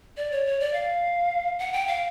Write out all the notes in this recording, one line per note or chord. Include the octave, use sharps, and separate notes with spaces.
D5
C#5
C#5
D5
F5
F#5
G5
F5